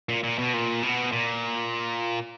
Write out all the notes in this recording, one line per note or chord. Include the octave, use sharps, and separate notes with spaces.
A#2
A#2
B2
A#2
B2
A#2